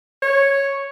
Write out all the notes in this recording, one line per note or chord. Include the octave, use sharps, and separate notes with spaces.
C#5